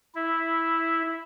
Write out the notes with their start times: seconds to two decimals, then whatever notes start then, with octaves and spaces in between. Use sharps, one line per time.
0.15 E4